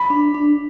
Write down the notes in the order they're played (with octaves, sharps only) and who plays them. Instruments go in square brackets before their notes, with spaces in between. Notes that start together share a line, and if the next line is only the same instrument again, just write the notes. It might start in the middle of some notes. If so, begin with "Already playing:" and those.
Already playing: [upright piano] B5
[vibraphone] D4
D4